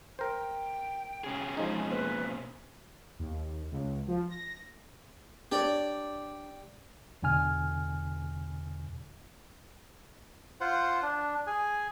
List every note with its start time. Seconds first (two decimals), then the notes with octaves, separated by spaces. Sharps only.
0.19 A#4 C5 G5
1.24 B2 C#4 G#4
1.57 F3 G#3 D#4
1.91 A#3 B4 C5
3.19 D#2
3.72 C#2
4.08 F3
4.29 A#6
5.52 D4 G4 C#5 D5
7.23 E2 B2 D3 G#5 F6
10.61 F4 C5 F#5
11.03 D4
11.47 G#4 G#5